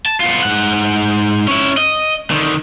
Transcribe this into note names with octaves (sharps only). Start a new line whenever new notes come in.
A5
B3 F4
G#2 F#5
C#4 E4
D#5
D3 D#3